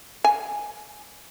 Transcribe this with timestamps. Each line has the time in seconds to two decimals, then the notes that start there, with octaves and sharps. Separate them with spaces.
0.24 G#5